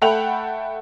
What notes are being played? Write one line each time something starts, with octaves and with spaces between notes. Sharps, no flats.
A3 A4 F#5 G5 B5 F7